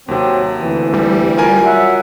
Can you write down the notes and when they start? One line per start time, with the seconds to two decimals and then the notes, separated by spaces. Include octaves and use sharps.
0.08 D#2 C3 F#3 C4
0.59 D2 E3
0.94 G3
1.38 F4 A#4 G#5
1.66 F#3 E5 F#5